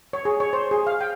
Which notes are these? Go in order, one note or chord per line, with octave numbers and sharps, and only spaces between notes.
C#5
G#4
C#5
C5
G#4
F5
G5